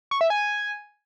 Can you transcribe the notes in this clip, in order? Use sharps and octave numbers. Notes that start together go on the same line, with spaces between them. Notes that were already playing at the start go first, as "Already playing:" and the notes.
C#6
E5
G#5